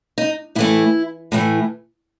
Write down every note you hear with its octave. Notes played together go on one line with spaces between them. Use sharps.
D#4
A2 E3 A3 E4
A2 E3 A3